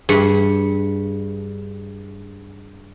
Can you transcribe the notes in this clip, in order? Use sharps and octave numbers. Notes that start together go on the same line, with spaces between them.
G2 G#4 C#7